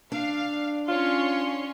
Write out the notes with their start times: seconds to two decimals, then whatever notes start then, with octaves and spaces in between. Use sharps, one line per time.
0.12 D4 F5
0.88 C#4 F4 C#5 C6